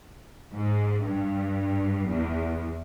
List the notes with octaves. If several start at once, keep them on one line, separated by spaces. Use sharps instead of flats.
G#2
G2
E2